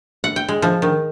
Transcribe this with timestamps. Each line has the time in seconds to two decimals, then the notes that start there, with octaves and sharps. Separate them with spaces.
0.24 F#5
0.36 G5
0.49 G#3
0.62 F3
0.82 D#3